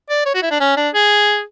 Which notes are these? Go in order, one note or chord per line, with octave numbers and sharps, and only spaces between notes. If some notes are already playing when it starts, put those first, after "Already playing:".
D5
C#5
F#4
E4
D4
C#4
D4
G#4